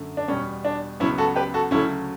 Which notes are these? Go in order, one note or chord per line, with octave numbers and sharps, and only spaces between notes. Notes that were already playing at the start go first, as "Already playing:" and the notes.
Already playing: F#2 D3 A3
D4
E2 B2 G3 B3 C#4
D4
C#2 C#3 F#3 B3 C#4 E4
F#4 A4
G4 B4
F#4 A4
D2 C#3 F#3 A3 C#4 E4